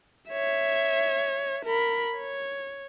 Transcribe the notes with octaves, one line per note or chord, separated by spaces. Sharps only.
C#5 E5
A#4 B5
C#5